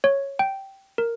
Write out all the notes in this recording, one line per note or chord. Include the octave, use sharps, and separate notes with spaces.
C#5
G5
A#4